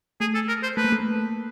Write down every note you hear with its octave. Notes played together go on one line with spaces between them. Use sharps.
A3 G#4
A4
A#4
C5
A3 B4
A#3
A3